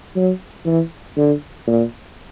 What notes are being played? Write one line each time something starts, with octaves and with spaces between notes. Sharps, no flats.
F#3
E3
D3
A#2